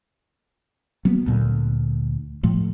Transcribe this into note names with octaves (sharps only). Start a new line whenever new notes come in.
F#3 A#3 B3
D2 A#2
A2 F3 A3